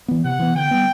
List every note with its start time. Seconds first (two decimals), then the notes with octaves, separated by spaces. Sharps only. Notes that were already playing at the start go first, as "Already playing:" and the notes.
0.08 E3 B3
0.24 C3 F#5
0.39 E3 B3
0.55 D3 G5
0.71 G3 B3